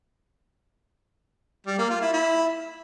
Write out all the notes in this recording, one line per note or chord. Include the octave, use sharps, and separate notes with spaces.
G3
A#3
F4
E4
E4